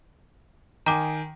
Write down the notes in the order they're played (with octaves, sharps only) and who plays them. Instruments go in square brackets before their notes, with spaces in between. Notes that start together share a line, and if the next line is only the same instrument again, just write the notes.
[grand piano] D#3 G#5 [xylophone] A#5 D6